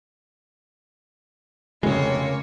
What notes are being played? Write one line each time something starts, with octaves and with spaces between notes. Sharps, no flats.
F1 C#3 G#3 A#3 C#5